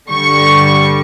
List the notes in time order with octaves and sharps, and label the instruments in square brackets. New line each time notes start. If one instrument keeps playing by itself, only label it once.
[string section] G2 D3 G3 C#6